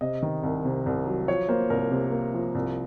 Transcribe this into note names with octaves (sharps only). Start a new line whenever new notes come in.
C3 D#5
D#3
C2
C3
C2
F#3
F3 C#5
A#3 C5
C2 A#4
C3
A#3
F3
C2